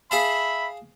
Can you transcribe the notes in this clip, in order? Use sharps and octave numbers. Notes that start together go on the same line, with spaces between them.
G#4 E5 F5 A5 B5